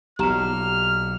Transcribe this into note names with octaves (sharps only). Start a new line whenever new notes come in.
B1 A#2 G4 A#5 F6 E7